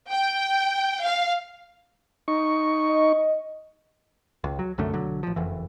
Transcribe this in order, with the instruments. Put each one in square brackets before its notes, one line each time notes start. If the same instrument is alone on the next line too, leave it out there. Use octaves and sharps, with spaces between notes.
[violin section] G5
F5
[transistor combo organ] D#4 C#6
[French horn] D#5
[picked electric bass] C#2
F#3
C2 F#2 D3 A3
B1 D3 F#3
A1 F3
F#1 F2 E3